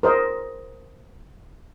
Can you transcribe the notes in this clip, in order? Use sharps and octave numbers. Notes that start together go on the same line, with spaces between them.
A#4 C5 D#5